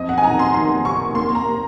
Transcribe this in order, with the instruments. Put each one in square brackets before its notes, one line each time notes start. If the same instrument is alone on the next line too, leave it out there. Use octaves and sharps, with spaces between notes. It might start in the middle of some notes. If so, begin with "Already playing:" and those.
Already playing: [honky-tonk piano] F2 D#5
F#5
G#5
D#3 A#5
C6
D#3 C6
C3 C#6
A#3 C6
A#5
C3